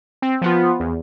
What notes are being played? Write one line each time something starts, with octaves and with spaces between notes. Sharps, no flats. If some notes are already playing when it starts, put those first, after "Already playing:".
C4
F3 B3 F4
E2